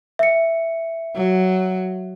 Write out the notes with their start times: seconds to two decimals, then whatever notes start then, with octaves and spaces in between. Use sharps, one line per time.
0.19 E5 C#7
1.16 F#3